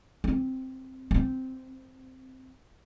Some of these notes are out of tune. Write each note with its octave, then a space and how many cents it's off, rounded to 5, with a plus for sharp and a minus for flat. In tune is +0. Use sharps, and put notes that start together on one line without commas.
C4 +0
C4 -5